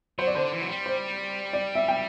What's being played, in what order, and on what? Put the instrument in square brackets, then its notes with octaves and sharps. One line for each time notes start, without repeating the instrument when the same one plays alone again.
[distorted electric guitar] F#3 [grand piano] C5
[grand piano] D5
[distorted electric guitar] D3 [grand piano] C5
[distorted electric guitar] E3
F#3
G3
[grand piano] C5
D5
E5
G5